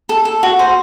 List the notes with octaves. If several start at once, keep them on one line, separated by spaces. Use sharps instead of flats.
A4
A4
F#4
C5